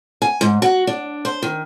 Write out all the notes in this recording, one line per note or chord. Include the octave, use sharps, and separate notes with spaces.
G#5
G#2
F#4
D4
C5
D#3